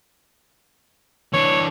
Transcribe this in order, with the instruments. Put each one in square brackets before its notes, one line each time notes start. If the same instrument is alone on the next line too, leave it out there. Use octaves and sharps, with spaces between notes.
[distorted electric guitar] E3 D4 [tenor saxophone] C#5